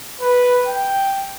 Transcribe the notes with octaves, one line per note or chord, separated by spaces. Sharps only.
B4
G5